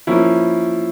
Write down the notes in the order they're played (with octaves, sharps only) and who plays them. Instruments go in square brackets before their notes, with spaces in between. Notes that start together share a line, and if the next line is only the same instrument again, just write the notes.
[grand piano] F3 A#3 C#4 E4